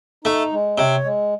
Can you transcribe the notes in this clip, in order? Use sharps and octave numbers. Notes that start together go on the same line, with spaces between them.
A3 D#4
G#3
C3 C#5
G#3